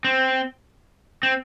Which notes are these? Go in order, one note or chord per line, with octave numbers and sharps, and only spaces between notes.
C4
C4